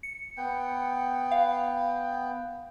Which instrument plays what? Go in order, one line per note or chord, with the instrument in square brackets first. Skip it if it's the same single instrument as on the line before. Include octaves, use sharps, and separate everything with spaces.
[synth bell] C#7
[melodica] B3 G5
[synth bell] F5